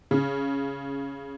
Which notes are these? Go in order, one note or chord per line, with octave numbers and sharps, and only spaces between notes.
C#3